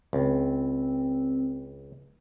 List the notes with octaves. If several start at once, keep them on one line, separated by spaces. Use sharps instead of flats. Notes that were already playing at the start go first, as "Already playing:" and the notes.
C#2 C4